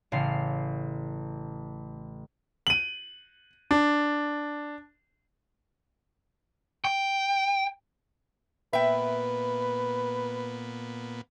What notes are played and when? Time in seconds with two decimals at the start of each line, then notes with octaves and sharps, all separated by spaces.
0.12 A1 C#3 F5 C6 A6
2.67 D#7 F#7
3.71 D4
6.85 G5
8.73 A#2 B3 B4 E5 G5